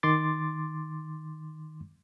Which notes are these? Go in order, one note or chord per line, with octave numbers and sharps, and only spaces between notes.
D#3 C6 D6 A6